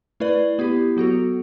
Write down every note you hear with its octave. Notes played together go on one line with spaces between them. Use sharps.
A3 E4 B4 D5
B3 E4 G4
F#3 B3 F#4 A4